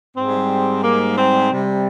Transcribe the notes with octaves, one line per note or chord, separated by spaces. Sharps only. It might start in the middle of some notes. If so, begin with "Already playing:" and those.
G#2 G3 C4
A#3
C4
C3 G3